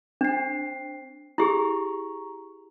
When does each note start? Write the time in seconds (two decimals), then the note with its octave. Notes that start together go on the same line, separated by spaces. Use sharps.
0.21 C4 D4 C7
1.38 E4 G4 G#4 A#5 C#6